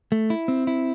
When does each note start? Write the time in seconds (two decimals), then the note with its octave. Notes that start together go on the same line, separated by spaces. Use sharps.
0.12 A3
0.30 E4
0.48 C4
0.67 E4